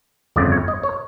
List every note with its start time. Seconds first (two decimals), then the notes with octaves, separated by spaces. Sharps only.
0.36 G1 F2 C#3 D5
0.52 C#5
0.68 D#5
0.83 C#5